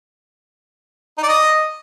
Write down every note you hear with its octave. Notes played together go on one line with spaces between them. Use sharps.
D#4
D5
D#5